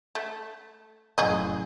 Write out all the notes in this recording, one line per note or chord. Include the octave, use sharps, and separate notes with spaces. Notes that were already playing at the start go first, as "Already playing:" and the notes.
A3
F1 F#2 A2 G#4 D#5